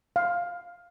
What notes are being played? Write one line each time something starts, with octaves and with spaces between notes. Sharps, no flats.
F5